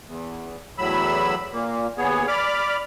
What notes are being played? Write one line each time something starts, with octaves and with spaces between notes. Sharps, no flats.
E2
E2 A2 F#3 B5 E6
A#2 A#3
D#2 B3 G#4 C#5
D5 B5 D6 F6